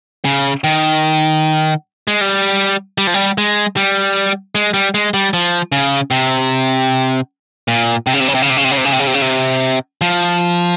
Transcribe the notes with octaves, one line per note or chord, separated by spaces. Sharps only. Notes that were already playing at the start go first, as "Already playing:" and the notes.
C#3
D#3
G#3
G3
G3
F3
G3
G#3
G3
G#3
G3
G#3
G3
F3
C#3
C3
A#2
C3
C#3
C3
C#3
C3
C#3
C3
C#3
C3
C#3
C3
C#3
C3
C#3
C3
C#3
C3
F3